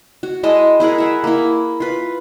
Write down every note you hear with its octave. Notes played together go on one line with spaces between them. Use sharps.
F#4
G#3 E4 D#5 A5
E4 G#4 A#4 F#5
E5 F#5
A#3 E4
F4 B4